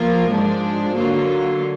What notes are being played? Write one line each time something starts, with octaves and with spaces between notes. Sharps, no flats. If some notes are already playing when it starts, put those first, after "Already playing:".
Already playing: F3 A#3 F4 A#4
G#2 F3 G#3 D4
D3 F#3 A#3 F4